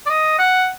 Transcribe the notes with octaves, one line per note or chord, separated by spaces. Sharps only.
D5
D#5
F#5